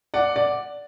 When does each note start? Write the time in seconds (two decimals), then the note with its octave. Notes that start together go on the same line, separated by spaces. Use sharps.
0.14 D5 F#5
0.36 D5